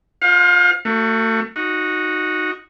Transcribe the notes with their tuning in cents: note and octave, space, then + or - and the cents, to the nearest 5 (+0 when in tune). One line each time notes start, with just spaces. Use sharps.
F4 +5 C5 +5 F5 +35
A3 +35 F#4 -10
D#4 +0 F#4 -10